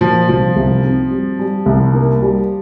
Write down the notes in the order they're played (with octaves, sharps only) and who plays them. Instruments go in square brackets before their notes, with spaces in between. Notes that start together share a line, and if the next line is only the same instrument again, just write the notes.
[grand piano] A#2 [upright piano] F3
[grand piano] C2 [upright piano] F3
[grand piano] C2
C4
G3
G3
C2
A#3
G3